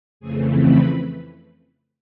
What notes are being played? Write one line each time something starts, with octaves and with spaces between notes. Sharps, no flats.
F2 C#3 E3 A3 C4 G#4 G#5
B4 B5